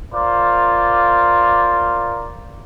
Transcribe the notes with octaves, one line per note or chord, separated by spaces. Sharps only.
F4 A#4 C5 D5